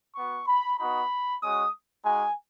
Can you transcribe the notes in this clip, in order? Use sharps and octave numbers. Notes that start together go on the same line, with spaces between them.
B3 F#4 C#6
B5
B3 D#4 F#4 B5
G#3 C#4 F#4 D#6
G#3 D#4 F#4 G#5